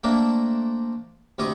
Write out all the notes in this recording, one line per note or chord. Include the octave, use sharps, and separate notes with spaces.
A3 A#3 C4 D4 A#4
D2 C3 C4 D#5 C#6 D6